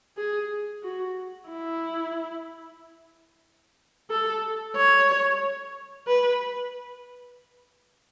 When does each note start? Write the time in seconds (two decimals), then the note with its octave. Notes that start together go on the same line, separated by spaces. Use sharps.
0.17 G#4
0.83 F#4
1.49 E4
4.10 A4
4.76 C#5
6.07 B4